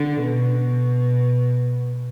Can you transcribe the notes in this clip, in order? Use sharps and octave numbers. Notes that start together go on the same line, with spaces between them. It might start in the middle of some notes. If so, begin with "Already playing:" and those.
Already playing: D3
B2